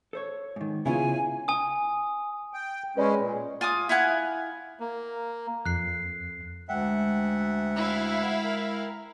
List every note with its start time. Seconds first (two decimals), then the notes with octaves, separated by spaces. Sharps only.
0.13 A4 C5 C#5
0.56 G#2 D#3
0.86 C#3 B3 C#4 E4 F4 G#5
1.48 G#5 D#6
2.54 G5
2.97 G#3 C#4 B4 D5 B5
3.19 A#2
3.61 F4 G#5 D6 D#6
3.89 E4 F5 F#5 G#5
4.80 A#3
5.66 F2 F#6 C7
6.69 D2 G#3 E5 F#5 G5
7.76 E4 F5
8.45 A#4